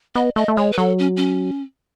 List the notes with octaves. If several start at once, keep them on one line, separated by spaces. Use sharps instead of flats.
B3 D#5
A3 D#5
A3
G#3 C#5
B4
F#3 A4
C#4
C#4